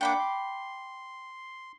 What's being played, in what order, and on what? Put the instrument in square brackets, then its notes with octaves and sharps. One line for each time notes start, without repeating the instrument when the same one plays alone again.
[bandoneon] A#3 D4 F#5 [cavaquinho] G5 B5 D6
[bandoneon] C6